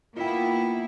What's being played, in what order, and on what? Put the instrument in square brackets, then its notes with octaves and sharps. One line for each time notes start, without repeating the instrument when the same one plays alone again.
[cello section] A#3 B3 E4 [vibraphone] F4 G5